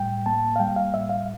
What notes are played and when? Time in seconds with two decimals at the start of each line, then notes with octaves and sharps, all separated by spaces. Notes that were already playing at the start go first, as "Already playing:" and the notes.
Already playing: A2 G3 G5
0.26 A#3 A5
0.56 F5
0.60 G3 G5
0.76 F5
0.94 A2 E5
1.10 F5